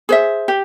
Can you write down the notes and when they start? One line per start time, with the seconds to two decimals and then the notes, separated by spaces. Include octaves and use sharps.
0.09 G#4 C5 E5
0.48 G4